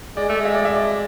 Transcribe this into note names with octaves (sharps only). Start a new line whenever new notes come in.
G#3 D5
A3
G#3 E5
D5
E5
D5